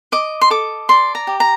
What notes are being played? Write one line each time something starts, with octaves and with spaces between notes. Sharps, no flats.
D#5 D6
C6
A4 D6
D5 C6
A#5
G4
A#5